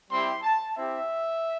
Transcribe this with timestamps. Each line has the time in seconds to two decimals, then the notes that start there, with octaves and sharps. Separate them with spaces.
0.10 G3 C4 E4 G4 C6
0.43 A5
0.76 C4 E4 G4 E5